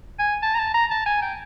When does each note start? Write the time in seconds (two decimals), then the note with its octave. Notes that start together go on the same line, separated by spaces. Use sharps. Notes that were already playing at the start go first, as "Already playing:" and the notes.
0.19 G#5
0.43 A5
0.55 A#5
0.59 A5
0.74 A#5
0.91 A5
1.06 G#5
1.22 G5